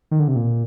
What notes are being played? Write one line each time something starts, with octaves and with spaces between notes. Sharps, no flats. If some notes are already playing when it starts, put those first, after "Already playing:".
D#3
D3
C3
A#2